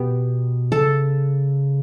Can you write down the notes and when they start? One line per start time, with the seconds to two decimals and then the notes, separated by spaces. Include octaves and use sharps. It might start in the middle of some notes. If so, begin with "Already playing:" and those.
Already playing: B2 B3 G4
0.72 C#3 A4